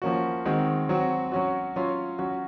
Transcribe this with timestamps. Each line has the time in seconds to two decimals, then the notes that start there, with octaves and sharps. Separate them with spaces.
0.02 F3 A#3 C#4 F#4
0.46 D#3 G#3 C4 F#4
0.89 F#3 C4 F#4
1.32 F#3 C#4 F#4
1.76 F#3 C#4 F4
2.19 F#3 C#4 F#4